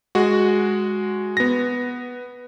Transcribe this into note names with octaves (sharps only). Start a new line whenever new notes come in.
G#3 F#4
B3 A#6